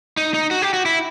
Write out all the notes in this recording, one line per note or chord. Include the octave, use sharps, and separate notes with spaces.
D#4
D#4
F#4
G4
F#4
E4